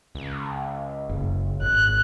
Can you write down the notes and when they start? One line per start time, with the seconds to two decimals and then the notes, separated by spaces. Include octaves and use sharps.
0.15 C#2
1.09 F#1
1.62 G#1 F#6